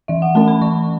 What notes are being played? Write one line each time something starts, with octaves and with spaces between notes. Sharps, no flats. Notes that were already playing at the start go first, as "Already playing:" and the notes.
E3 E5
F#5
A3 C#4 A5
B5
E3 C#6